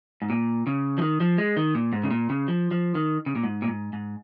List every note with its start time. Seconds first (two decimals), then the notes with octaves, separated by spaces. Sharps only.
0.22 G#2
0.30 A#2
0.67 C#3
0.98 F3
1.02 D#3
1.20 F3
1.38 G#3
1.57 D#3
1.75 A#2
1.93 G#2
2.03 C#3
2.11 A#2
2.30 C#3
2.48 F3
2.71 F3
2.95 D#3
3.26 C#3
3.36 A#2
3.44 G#2
3.62 A#2
3.68 G#2
3.93 G#2